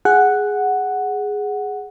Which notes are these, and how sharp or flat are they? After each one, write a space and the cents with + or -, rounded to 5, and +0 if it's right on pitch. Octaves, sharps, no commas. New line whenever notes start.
G#4 +0 F#5 +0